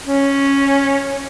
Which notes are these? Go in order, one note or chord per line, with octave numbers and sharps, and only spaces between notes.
C#4